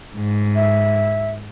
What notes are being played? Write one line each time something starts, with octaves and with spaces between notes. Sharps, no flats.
G#2
E5